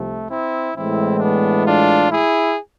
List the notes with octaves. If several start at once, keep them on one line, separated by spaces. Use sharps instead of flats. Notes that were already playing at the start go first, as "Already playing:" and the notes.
Already playing: C2 C3 F3 A3
C4 E4
A2 E3 G#3 C4 E4
B3 D4
D4 F4
E4 G#4